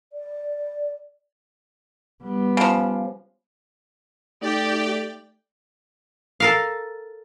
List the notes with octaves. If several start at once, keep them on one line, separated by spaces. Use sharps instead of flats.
D5
G3 B3
C#3 F3
A3 D#4 G4 D5 G5
A4 A#4 F5